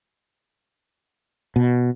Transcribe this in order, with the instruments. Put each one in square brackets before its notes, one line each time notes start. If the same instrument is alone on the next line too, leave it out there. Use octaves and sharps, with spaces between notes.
[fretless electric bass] B2